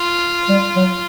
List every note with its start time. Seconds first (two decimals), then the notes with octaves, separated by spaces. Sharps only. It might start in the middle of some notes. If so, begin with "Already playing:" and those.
Already playing: F4
0.49 G3
0.76 F#3